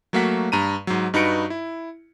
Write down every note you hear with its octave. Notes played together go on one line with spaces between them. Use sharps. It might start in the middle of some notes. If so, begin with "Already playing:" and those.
F#3 A3 A#3 F#4 F#5 B6
G2 A#5 D#7
G#2 F#3
G2 D#4 F#4 B4 C#7 D7
E4